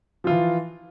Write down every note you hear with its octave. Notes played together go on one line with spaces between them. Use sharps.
E3 F3 F4